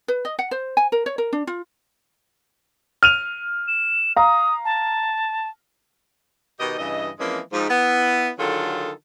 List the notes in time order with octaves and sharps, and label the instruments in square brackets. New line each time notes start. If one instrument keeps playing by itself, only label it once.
[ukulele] B4
D#5
F#5
C5
G#5
A#4
C#5
A#4
D4
F4
[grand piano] F6 D#7 F7
[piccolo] E7
[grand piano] F5 A#5 [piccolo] D#6
[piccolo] A5
[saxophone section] B2 D#3 G4 D#5
G2 C#3 E3 D#5
E3 F3 G#3 A#3 C4 C#4
G#2 F3
B3 E4
D3 D#3 F#3 F4 G#4 A4